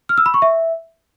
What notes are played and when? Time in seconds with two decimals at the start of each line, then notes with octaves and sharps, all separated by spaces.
0.09 F6
0.18 E6
0.26 B5
0.34 C#6
0.42 E5